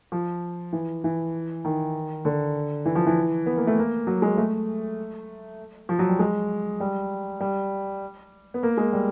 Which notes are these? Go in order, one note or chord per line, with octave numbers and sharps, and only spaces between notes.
F3
E3
E3
D#3
D3
E3
F3
E3
B3
A#3
A3
A#3
F#3
G#3
A3
F3
F#3
G3
G#3
G3
G3
B3
A#3
G#3
G3